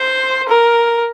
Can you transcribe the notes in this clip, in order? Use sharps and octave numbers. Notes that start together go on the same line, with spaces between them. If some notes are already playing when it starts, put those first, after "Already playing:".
Already playing: C5
A#4